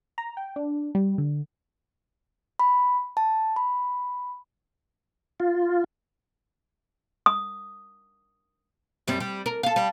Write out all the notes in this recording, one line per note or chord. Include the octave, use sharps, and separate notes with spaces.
A#5
G5
D4
G3
D3
B5
A5
B5
F4
D#6
F#2 G3 C4
G3
A#4
A4 F5
G3